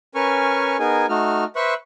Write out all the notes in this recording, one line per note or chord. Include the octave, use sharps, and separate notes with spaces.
C#4 A#4 B4 G#5 C#6 F6
B3 D#4 G#4 A#4 G#5
A3 D#4 F#4 F6
B4 C5 E5 C#6 E6 F#6